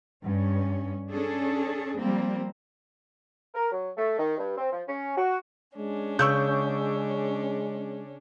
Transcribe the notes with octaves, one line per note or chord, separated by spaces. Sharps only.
G2 C#4
C#4 D4 G#4 A4
F3 G3 A#3 C4
A#4
F#3
A3
D#3
G2
C4
F3
C#4
F#4
G#3 C#4 D4
C#3 G#3 C#6 E6 G6